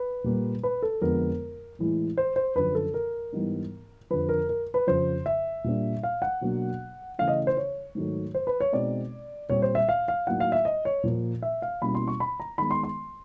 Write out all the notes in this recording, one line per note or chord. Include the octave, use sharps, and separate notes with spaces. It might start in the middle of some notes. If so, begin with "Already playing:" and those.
Already playing: B4
A#2 G3 A#3
B4
A4
F2 D3 F3 G#3 B3 A#4
A2 E3 G#3
C5
C5
F#2 D3 F3 B4
A4
A#4
G#2 E3 G3 B3 D#4
F2 D3 F3 B4
A#4
A#4
B4
F2 C#3 F3 C5
E5
A#2 G3 A#3 D4
F5
F#5
B2 F#3 A#3 D4
C#3 E3 A3 C#4 E4 F5
D#5
C5
C#5
G#2 D#3 F#3 A3
C5
B4
C#5
B2 G#3 C4 D#4 D5
A#2 G3 C4 C#5
C5
E5
F5
F5
A2 F#3 A#3 D#4 F#5
F5
E5
D#5
C#5
A#2 F3 A#3
E5
F5
B2 G3 A#3 C#4 E4 B5
C6
C#6
B5
A#5
D#3 G#3 B3 B5
C6
C6